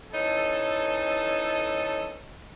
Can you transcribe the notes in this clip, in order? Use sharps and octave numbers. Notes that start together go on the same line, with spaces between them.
E3 C#4 D#4 A4